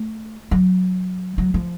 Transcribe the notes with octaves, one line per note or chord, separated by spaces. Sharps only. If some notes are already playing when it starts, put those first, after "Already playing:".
Already playing: A3
F#3
F#3
F3